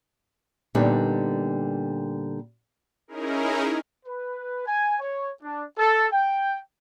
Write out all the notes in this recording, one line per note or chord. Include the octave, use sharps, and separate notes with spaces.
A#2 D3 G3 B3 D#4
C#4 D#4 E4 G#4 A#4
B4
G#5
C#5
D4
A4
G5